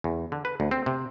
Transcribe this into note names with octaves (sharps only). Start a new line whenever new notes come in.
E2
D3
B4
D2
C4
C3